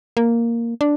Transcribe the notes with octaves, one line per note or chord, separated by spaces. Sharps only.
A#3
D4